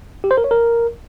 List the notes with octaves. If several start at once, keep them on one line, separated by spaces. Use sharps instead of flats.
G4
C5
A#4
C#5
A#4